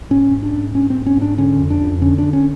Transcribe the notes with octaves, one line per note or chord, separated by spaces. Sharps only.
G#2 C#4
G#2
D4
G#2
G#2 C#4
C4
G#2
C#4
G#2 D4
D3 C#4
F2
D4
F2
D3 C#4
D3 D4
C#4